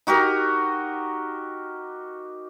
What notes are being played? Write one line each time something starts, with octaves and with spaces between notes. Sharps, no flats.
D#4 F#4 G4 A#4